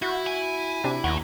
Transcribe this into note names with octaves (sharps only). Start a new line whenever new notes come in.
E4 F#4 G6
G#5
C3 D4
D#2 A3 F#5 A#5